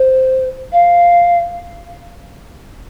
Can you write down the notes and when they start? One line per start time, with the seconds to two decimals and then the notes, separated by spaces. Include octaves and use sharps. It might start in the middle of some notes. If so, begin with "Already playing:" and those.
Already playing: C5
0.72 F5